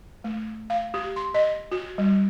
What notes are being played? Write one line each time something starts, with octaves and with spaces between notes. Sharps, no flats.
A3
F5
G4
C6
D#5
F#4
G3